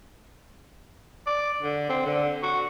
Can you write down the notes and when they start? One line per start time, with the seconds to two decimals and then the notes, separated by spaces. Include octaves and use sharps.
1.26 D5
1.62 D3
1.89 C4
2.05 D3
2.43 F#4